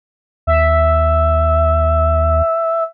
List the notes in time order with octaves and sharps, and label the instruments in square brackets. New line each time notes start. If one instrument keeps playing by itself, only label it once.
[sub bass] D#2 [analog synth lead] E5